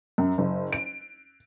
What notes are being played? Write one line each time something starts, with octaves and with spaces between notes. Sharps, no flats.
F#2
F#1
D7